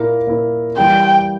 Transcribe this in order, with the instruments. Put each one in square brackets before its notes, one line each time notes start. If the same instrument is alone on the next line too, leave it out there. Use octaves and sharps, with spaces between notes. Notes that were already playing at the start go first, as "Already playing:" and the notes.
Already playing: [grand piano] A#2 A#3 E4 A#4
A#2 A#3 E4 A#4
[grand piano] E3 G3 A#3 E4 G4 [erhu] G5